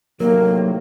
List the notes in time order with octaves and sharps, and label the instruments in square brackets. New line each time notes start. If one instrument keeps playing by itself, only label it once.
[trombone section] A2 C3 D#3 [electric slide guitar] F#3 [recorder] A#3 [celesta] A#4